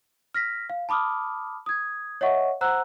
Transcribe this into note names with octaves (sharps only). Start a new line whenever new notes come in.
F6 A#6 B6
F5
A5 B5 D6 D#6 F6
D#6 G#6
C#5 D#5 E5 F#5 C#6
C5 F#5 A#5 E6 F#6